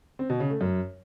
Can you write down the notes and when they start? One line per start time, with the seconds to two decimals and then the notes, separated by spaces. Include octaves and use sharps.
0.19 C4
0.30 B2
0.40 C#3
0.50 A3
0.61 F#2